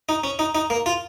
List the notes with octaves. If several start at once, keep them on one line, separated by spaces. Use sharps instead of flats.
D#4
C#4
D#4
D#4
A#3
F4